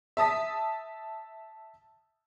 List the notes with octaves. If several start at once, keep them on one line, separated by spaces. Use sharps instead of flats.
E5 A5 D#6 B6